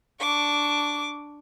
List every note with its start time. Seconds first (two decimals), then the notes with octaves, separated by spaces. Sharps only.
0.20 D4 C#6 D6